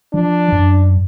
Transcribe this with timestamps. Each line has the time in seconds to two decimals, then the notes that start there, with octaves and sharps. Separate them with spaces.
0.14 F3 D4
0.52 F#2